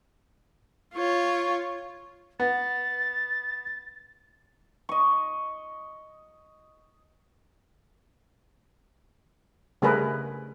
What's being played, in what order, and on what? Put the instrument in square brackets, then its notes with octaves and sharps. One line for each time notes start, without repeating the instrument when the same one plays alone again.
[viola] F4 C#5
[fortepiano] B3 [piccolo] A6
[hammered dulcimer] D#5 C#6
[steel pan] C#3 G3 A3 G#4 A#4 B4